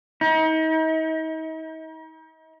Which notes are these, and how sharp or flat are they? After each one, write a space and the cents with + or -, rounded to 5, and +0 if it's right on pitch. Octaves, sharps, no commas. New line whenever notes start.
D#4 +40